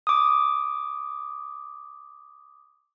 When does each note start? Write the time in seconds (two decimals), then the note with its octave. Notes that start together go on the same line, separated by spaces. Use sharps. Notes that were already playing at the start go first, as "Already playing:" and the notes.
0.07 D6 D#6